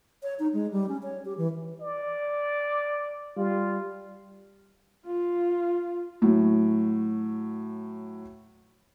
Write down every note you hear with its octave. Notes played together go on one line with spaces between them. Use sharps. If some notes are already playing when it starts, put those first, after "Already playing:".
C#5
D#4
G#3
G3
C#4
C#5
G4
E3
D5
G3 F4
F4
A2 F#3